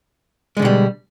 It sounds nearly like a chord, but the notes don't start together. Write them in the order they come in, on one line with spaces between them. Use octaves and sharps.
G#3 D3 B2 G3